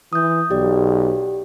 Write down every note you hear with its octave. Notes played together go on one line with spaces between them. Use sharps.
E3 D#6 G6
B1 G4 D5